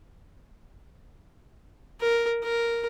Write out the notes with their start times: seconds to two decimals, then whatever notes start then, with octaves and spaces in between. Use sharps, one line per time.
2.01 A#4
2.44 A#4